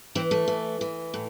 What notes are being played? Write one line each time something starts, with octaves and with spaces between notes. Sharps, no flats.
E3 C4
A3
E3
E3
A2